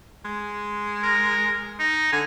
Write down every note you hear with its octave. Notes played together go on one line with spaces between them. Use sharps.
G#3
A#4
D#4
D3 G#5